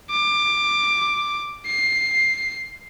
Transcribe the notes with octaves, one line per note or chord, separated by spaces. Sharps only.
D6
C7